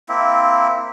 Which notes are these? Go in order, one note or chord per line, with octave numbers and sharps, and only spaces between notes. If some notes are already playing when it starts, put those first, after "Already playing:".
A#3 C4 E4